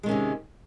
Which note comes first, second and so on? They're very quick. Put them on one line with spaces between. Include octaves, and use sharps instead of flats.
G#3 D#3 C#4 C3